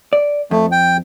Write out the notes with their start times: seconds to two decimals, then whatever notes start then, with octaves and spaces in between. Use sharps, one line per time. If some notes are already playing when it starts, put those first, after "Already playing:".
0.13 D5
0.51 F2 A3
0.72 G5